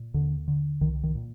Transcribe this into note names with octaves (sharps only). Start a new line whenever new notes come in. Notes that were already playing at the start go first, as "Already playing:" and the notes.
Already playing: A#2
D#2 D3
D3
C2 D#3
D#3
A#2